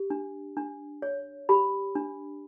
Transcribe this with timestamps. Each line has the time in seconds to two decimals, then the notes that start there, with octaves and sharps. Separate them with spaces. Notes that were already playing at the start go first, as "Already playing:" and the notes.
Already playing: G4
0.10 D4
0.57 D4
1.02 C#5
1.49 G4 B5
1.95 D4